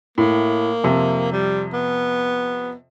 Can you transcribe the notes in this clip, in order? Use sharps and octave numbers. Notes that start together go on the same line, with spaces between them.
A2 A#3
F2 C3
G3
B3